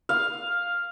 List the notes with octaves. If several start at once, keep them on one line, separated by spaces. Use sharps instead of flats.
F5